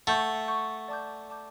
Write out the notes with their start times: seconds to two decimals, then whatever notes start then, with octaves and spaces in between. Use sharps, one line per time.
0.07 A3 F#5 C#6 G6
0.48 F#5 C#6 G6
0.88 D5 A5 D6 G6
1.29 D5 A5 D6 G6